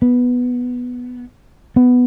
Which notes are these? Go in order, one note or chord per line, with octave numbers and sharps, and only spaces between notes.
B3
B3